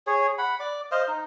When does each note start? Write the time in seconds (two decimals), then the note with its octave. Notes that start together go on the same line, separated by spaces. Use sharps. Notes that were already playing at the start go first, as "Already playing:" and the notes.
0.07 G#4 C#5
0.38 F#5 B5
0.60 D5
0.92 C5 D#5 F5
1.08 D#4